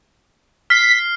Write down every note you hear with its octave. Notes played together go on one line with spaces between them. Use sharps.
F6 B6 C7